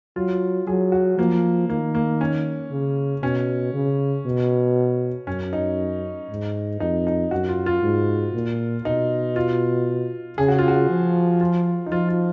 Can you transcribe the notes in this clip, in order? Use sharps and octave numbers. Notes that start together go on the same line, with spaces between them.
F#3 F4
F#3 G#4
F#4
F3 A#3
D#3 A#3
A#3
C#4
C#3
B2 C#4
C#3
B2
F#2 C#4
D#4
G#2
F2 D#4
D#4
F#2 F#4
F4
F4
G#2
A#2
B2 D#4
F4
C#3 G#4
F#4
F4
F#4
F3
F4
D#4
F3 F4
F4